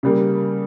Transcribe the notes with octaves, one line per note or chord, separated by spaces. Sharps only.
C#3 G3 A#3